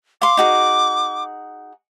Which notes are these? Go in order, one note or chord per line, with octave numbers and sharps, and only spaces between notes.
F5 C6 D6
D#4 F#4 G#4